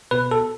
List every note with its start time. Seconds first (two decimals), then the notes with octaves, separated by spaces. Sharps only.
0.11 B2 B4
0.31 A4